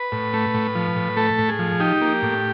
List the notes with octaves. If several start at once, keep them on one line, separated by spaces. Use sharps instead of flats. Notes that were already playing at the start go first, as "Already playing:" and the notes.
Already playing: B4
A2
A3
A2
F3
A2
A3 A4
A2
G#4
F3
D#4 G4
A#3
A2